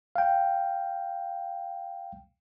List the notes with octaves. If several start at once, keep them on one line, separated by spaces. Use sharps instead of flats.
F5 G5